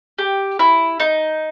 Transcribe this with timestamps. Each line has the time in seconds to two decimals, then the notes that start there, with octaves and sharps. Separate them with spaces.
0.18 G4
0.59 E4
1.00 D#4